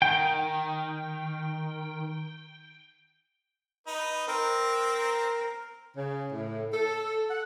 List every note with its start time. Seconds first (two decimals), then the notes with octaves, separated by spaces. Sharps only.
0.02 D#3 G5
3.87 D#4 B4
4.28 C4 A#4
5.96 C#3
6.32 A2
6.74 A4
7.30 F#5